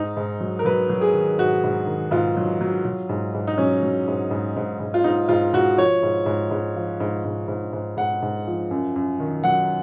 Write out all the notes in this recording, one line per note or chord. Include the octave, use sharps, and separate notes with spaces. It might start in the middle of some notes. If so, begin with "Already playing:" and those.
Already playing: G#2 D#4
G#2
F#3
A#4
F#3 B4
F#3
G#4
D#3
G#2 F#4
G#2
D#3
G#2 F4
F#3
F#3
F#3
G#2
G#2
D#4
F#3 C#4
F#3
G#2
G#2
G#2
G#2
F4
G#2 D#4
G#2 F4
G#2 F#4
F3 C#5
G#2
G#2
G#2
F3
G#2
G#2
G#2
G#2
G#2 F#5
G#2
F3
F#2
F#2
D#3
F#3 F#5